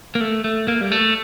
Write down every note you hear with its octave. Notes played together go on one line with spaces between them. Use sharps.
A#3
A3
A3
A#3
G3
A3